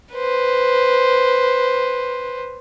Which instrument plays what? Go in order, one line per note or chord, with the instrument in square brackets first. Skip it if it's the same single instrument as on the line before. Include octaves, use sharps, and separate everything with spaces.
[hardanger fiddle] B4 C5